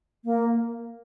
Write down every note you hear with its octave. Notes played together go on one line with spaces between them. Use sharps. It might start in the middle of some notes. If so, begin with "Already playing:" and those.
A#3